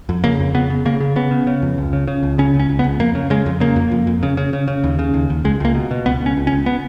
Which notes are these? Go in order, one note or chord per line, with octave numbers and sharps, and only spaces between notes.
F2
C#3 A#3
F2
C#3 B3
C#3
C#3 A#3
C#3
C#3 B3
C#3
C#3
F2
C#2
C#3
C#3
C#2
C#3 C#4
C#2
C#4
C#2
B3
C#2
F2 A#3
C#3
C#3 G#3
F2
C#3 A#3
F2
F2
F2
C#3
C#3
C#3
C#3
D#2
C#3
D#2
D#2
C#2 G#3
C#2 A#3
B2
B2
C#2 B3
C#2
C#4
C#2
C#4
C#2
B3